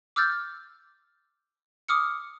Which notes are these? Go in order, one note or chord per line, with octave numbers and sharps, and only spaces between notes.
D6 E6 F6 G6 A6
D6 D#6 F6 C#7